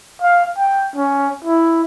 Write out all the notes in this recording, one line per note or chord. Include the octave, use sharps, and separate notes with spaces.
F5
G5
C#4
E4